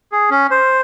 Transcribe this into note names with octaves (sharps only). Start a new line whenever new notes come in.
G#4
C#4
C5